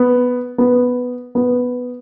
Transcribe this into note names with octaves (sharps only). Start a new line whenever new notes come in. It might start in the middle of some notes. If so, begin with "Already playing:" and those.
Already playing: B3
B3
B3